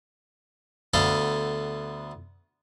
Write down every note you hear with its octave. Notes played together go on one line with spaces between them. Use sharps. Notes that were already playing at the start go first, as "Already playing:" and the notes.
D2 B3 A4 F5